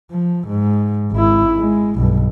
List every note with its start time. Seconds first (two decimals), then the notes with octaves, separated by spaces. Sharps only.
0.11 F3
0.48 G#2
1.12 G#1 E4
1.58 G#3
1.96 B1 G2